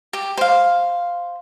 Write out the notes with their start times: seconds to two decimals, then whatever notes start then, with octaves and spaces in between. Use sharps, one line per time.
0.13 G4
0.37 C5 F5